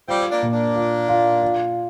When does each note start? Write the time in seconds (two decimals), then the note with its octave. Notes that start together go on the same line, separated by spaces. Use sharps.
0.08 G3 C4 F4
0.31 A#3 D4
0.42 A#2
0.53 A#3 D4
0.75 F4
1.09 F4
1.42 F4